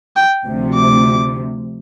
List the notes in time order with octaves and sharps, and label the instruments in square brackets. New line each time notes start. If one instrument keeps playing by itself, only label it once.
[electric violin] G5
[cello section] D2 C3 F3
[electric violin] D6